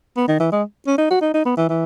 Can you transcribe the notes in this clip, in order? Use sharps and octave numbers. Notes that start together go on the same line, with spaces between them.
B3
D#3
E3
G#3
C#4
D#4
F#4
D#4
D#4
B3
E3
E3